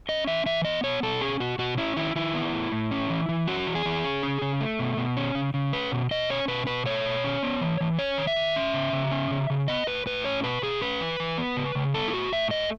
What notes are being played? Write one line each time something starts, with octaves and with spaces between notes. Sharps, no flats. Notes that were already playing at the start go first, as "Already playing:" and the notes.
C#4 D#5
E3 E5
E3 E5
B3 D#5
B2 C#5
B2 A4
C#4 G#4
B2 F#4
B2 F#4
C#4 E4
D#3 E4
D#3 E4
B3
A2
A2
C#4
E3
E3
C#4 F#4
E3
G#4
E3
C#4
C#3
C#3
A3
B2
B2
C#4
C#3
C#3
C#4 B4
B2
B2 D#5
C#4 C#5
B2 B4
B2 B4
A3 C#5
B2
C#4
B3
E3
E3
C#4 C#5
D#3
E5
D#3
C#4
C#3
C#3
C#4
C#3
C#3
B3 D#5
A2 B4
A2 B4
C#4 C#5
B2 B4
B2 G#4
C#4 B4
E3
E3
B3
C#3
C#3
B3 A4
E4
A2 F#4
A2 E5
A3 D#5